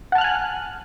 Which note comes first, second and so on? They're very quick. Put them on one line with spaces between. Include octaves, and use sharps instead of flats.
F#5 A5 F6 F#6 G#5